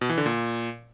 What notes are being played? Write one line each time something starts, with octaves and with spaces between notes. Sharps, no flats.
B2
E3
D3
A#2